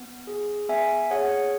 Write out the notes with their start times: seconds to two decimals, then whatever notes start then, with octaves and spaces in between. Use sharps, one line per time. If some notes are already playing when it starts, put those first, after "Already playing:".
Already playing: B3
0.27 G#4
0.69 B3 E5 G#5
1.11 G#4 C#5 F#5